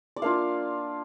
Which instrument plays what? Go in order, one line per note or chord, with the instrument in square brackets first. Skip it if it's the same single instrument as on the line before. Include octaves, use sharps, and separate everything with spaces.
[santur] D5
A#3 D4 F4 F5